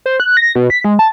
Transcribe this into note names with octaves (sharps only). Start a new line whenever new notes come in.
C5
F#6
A#6
B2
B6
G#3
A5